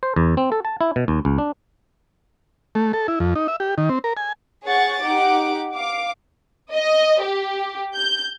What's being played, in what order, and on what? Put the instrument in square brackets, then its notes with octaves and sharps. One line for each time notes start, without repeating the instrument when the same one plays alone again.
[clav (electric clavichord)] C5
E2
C4
A4
A5
E4
B2
D#2
C#2
D4
[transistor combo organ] A3
A4
E4
F2
D#4
E5
G4
D#3
C4
A#4
G#5
[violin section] G#4 C#5 F#5 C#6 A6
D#4 G4 F#5 D6
F5 D6
D#5
G4
G6